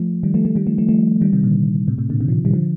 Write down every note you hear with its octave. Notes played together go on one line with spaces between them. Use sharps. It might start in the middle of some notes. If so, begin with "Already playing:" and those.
Already playing: F3 A3
D#3 G3
F3 A3
F3 A3
D#3 G3
F3 A3
F3 A3
F3 A3
D#3 G3
C3 D#3
A#2 D3
A2 C3
A2 C3
A#2 D3
C3 D#3
D3 F3
D#3 G3
D3 F3